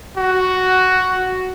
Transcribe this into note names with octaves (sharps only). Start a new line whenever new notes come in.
F#4